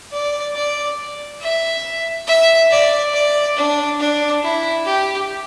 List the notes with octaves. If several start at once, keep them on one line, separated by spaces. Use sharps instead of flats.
D5
D5
E5
E5
D5
D5
D4
D4
E4
G4